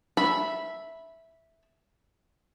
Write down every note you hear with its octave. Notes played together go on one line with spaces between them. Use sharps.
E5 B5